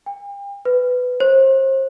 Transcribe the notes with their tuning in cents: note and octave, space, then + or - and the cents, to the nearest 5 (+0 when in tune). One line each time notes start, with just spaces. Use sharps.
G5 +40
B4 +15
C5 +35